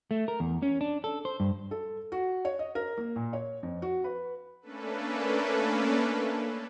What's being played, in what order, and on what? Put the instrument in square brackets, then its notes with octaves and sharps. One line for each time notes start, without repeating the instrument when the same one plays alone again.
[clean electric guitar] A3
A#4
E2
C#4
D4
A4
C5
G2
[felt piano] A4
F#4
C#5
D#5
A#4
A#3
A#2
C#5
F2
F#4
B4
[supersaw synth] A3 A#3 C#4 D4 A4 B4